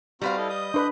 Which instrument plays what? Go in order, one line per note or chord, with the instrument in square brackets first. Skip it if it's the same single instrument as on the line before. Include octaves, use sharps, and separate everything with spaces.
[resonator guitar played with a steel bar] G3 B4 F5 [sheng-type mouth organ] C4 F#4 A#5
[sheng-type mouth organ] E4 A4 D#5
D#5 D#6 G6
[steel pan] D4 B4